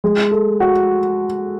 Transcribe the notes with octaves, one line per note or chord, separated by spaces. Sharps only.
G#3
A4
F#4